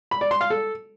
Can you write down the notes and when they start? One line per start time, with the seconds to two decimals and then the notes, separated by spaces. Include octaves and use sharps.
0.11 B5
0.21 D5
0.31 C6
0.41 F5
0.50 A4